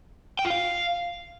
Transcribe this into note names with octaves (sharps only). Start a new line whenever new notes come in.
G5
F4
F5